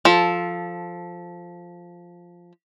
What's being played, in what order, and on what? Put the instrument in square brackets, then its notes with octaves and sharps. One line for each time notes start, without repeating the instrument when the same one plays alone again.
[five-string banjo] F3 A4